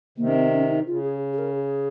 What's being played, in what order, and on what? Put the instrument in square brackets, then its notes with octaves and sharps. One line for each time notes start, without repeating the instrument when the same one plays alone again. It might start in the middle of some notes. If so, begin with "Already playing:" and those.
[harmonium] C3 D#3 [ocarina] A#3
[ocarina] C#4
C4
C#4
D#4
[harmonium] C#3 [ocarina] F4
[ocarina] G#4
G#4
A#4
G#4